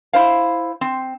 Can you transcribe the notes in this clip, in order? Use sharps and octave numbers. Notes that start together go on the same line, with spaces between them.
E4 C5 F5
C4